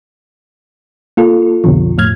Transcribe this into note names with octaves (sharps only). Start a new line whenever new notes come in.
A#3 F4 A4
B1 F2 B2 D3 F3
F2 A2 F6 G#6